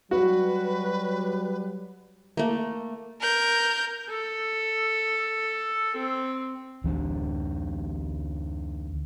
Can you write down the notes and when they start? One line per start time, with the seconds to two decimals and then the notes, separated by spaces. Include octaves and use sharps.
0.11 F#3 G3 F#4 B4
2.37 A3 A#3
3.21 A#4 G6
4.10 A4
5.98 C4
6.84 D2 E3 F3 D4